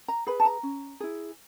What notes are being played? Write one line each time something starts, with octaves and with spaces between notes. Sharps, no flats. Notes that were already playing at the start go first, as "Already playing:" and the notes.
A#5
G#4 B4 B5
A5
A#5
C#4
E4 G#4